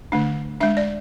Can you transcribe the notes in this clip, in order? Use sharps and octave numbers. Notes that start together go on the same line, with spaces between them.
D3 A3 D4
G#3 D4 E5
D5